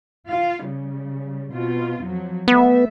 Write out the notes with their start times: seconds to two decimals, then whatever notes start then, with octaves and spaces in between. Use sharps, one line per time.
0.29 F4 F5
0.65 C#3 G3
1.53 B2 C4 F4
2.03 F2 F3 F#3
2.48 G3 A3 B3 E5